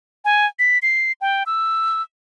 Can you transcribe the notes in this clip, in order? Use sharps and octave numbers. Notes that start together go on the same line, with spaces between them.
G#5
B6
C7
G5
E6